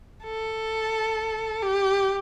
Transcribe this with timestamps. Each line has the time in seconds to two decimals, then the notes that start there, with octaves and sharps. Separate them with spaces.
0.24 A4
1.63 G4